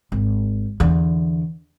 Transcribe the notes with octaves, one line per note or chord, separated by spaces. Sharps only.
G#1
E2 D3